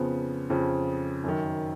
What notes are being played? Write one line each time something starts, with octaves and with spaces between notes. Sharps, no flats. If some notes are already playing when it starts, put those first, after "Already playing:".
Already playing: F2 C#3 F3 B3
F2 C#3 F3
F#2 D#3